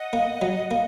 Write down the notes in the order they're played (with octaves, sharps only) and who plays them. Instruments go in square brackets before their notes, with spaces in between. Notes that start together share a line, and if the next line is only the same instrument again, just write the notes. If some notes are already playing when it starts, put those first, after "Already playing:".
Already playing: [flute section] D#5 F#5
[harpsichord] A#3
F#3
A#3